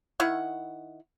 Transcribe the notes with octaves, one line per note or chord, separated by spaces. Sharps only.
D#3 E4 F#5